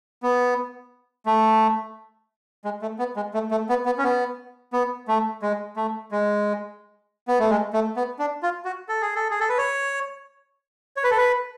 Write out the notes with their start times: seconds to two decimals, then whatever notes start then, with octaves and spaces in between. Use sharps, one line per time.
0.23 B3
1.26 A3
2.65 G#3
2.82 A3
2.99 B3
3.16 G#3
3.34 A3
3.51 A3
3.69 B3
3.86 B3
3.98 C#4
4.03 B3
4.73 B3
5.08 A3
5.42 G#3
5.76 A3
6.11 G#3
7.28 B3
7.40 A3
7.50 G#3
7.73 A3
7.96 B3
8.19 D4
8.43 F4
8.65 F#4
8.89 A4
9.01 G#4
9.15 A4
9.31 G#4
9.40 A4
9.49 B4
9.58 C#5
10.97 C#5
11.04 B4
11.11 A4
11.18 B4